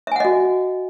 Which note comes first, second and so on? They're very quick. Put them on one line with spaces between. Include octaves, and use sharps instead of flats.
E5 G#5 F#5 D#5 F#4